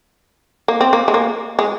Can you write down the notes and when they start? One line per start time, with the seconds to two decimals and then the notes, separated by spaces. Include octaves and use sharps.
0.68 A#3
0.81 C4
0.93 A#3
1.08 G#3
1.14 A#3
1.59 G#3